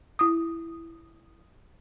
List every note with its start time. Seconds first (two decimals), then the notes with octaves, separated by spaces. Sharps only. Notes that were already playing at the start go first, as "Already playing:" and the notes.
0.19 E4 D#6